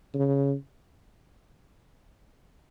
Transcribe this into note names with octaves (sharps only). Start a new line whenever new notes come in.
C#3